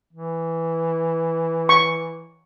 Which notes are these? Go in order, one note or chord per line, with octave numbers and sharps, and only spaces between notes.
E3
C#6